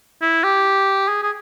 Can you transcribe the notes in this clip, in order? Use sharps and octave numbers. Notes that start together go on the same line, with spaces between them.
E4
G4
G#4
G#4